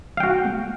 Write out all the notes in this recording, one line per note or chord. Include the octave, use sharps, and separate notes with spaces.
F#4 F5 G5